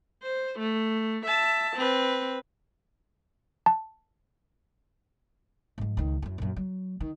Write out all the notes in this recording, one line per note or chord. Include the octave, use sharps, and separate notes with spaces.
C5
A3
E5 A5
C4 B4
A5
G#2 F3
C#2 D#3
F#2 E4
A#1 F#2
F#3
D#3